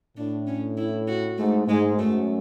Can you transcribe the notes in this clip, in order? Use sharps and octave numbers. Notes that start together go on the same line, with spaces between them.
A2 D4
C#4
E4
F#4
G#2 A3
G#2 G#3
F#2 A3